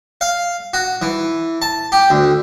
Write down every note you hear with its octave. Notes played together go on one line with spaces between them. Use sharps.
F5
F#4
E3
A5
G4
D2